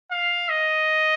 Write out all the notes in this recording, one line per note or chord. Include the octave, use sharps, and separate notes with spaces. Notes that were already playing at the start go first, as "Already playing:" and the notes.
F5
D#5